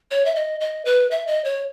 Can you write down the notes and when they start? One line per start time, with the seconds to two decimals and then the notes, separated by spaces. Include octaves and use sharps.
0.11 C#5
0.25 E5
0.35 D#5
0.60 D#5
0.85 B4
1.11 E5
1.27 D#5
1.44 C#5